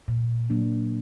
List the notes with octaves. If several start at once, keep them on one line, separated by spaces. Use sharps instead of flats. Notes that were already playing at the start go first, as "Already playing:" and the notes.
A#2
F#3 A#3 D4